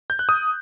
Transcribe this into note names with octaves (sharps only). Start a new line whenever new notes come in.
G6
F#6
D#6